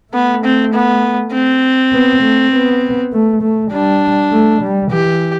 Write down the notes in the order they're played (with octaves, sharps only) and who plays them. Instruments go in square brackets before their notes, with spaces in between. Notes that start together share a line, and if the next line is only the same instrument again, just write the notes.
[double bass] A3 [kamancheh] B3
[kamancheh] C4
B3
C4
[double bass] B3
A3
B3
A3
A3
[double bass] G3 [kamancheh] D4
[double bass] A3
G3
[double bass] E3 [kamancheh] G4